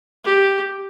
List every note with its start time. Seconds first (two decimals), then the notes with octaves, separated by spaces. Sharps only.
0.24 G4